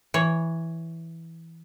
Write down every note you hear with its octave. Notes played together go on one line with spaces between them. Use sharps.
E3 C#5